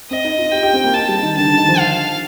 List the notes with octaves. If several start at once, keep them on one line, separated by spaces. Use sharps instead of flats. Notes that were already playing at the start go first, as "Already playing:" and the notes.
C4 D#5
D#4
F4
G4 G5
G4
C4
A#3
A5
G3
D#3
D3 A5
D3
D#3
F3
F5